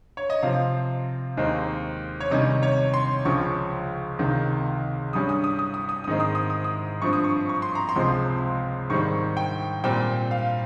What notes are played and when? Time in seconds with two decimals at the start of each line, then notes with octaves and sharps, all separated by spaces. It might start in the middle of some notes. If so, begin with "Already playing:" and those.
0.17 C#5
0.30 D#5
0.43 C3 F3 C4 F5
1.37 D#2 D#3 G#3 C4
2.20 C#5
2.31 C3 D#3 G3 C#4 D#5
2.63 C#5
2.94 C6
3.25 C#2 C#3 F3 C#6
4.19 C#2 C3 D#3
5.13 G2 G3 C#4 D#6
5.29 D#6
5.44 D#6
5.59 D#6
5.74 D#6
5.89 D#6
6.04 D#6
6.07 G#2 D#3 G#3 C4
6.20 D#6
6.35 D#6
6.50 D#6
6.64 D#6
7.02 G2 F3 C4 C#6
7.13 D#6
7.24 C#6
7.49 C#6
7.62 C6
7.75 A#5
7.89 C6
7.96 C#2 C3 F3 G#3 C4
8.90 G#2 D#3 G3 C4 C#6
9.37 G5
9.84 A#2 G3 C4 G5
10.31 F5